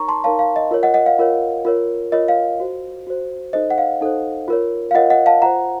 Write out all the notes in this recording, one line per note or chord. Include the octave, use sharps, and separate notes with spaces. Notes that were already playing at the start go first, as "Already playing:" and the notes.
Already playing: D#4 A#4 C#5 A#5 C#6
A5 C6
D#4 A#4 C#5 F5 A5
F5
D#5
F4 A#4 C#5
D#5 F#5
D#5 F#5
F5
F4 A#4 C#5
F4 A#4 C#5
F4 A#4 C#5 D#5
F5
F#4 C5
F#4 C5
D#4 A4 C5 D#5
F#5
F5
D#4 A4 C5
F4 A#4 C#5
F5
F4 A#4 C#5 D#5 F#5
D#5 F#5
F5 A5
F4 C5 F#5 A#5